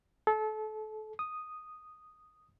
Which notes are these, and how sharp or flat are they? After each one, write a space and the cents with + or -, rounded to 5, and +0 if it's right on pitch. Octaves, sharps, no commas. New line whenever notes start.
A4 -30
D#6 -5